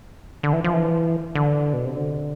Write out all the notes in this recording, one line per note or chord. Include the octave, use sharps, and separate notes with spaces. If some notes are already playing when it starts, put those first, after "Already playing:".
D3
E3
F3
E3
D3
B2
C3
D3